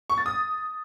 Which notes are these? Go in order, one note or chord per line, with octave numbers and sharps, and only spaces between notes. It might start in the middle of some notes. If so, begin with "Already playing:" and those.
C#6
A6
D#6